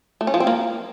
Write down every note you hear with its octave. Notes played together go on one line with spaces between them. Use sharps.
A3
C#4
F3
C4
A#3